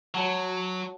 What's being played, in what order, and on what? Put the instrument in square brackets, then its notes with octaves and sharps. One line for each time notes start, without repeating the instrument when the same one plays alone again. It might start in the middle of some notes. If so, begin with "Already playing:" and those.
[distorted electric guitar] F#3 [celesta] F#4 C#5 F#5 A5